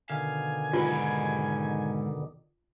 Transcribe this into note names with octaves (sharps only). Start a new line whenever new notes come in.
B2 D3 D#3 F5 G#5
G#2 F4 B4